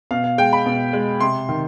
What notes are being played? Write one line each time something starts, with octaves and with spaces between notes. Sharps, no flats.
B2 F5
F5
G#3 G5
B5
B2
G#3
C3 C6
D#3